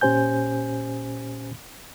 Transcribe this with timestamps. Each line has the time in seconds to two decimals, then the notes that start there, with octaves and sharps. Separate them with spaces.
0.01 A#2 C#4 G4 C5 G#5 G6